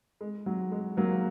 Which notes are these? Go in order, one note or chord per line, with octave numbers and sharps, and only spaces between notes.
G#3
F#3
G#3
F#3 A#3